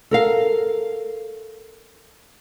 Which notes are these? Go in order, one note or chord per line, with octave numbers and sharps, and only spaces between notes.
A4 A#4 F5